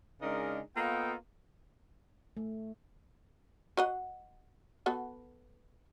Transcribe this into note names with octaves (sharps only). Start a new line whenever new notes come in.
C#3 G#3 D4 D#4 A#4
A#3 B3 F4 A4 D#5 G5
A3
F#4 D#5 F#5
B3 F#4 A4